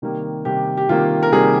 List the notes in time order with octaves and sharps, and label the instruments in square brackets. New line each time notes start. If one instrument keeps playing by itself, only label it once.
[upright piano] C3 D#3 G3 A#3
C3 D#3 G3 A#3 G4
G4
C3 D#3 G3 A#3 F4
A#4
C3 D#3 G3 A#3 G#4